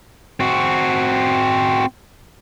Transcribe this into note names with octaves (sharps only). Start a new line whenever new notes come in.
C4 F#4